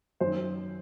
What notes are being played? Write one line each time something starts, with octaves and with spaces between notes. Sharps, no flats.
F#2 D#3 C5